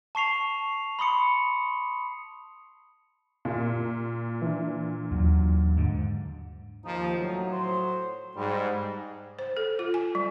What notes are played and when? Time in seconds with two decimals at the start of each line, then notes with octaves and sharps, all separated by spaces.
0.15 A5 C#6 C7 F7
0.99 B5 C6 D#6 C#7
3.45 A#2
4.42 E3 D4
5.11 D#2 F#3
5.77 G#2 D3
6.85 D#2 F3 D#4
7.17 A2 F#3
7.52 C5
8.36 G#2 G3
9.39 C5
9.57 A4
9.79 F4
9.94 G#5
10.15 G3